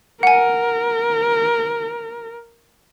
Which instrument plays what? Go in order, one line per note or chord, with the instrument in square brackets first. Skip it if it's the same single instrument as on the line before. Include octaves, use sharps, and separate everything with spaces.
[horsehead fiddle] A#4 [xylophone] F#5 G#5